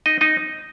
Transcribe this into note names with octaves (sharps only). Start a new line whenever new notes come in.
D#4 D#5
D#4 D#5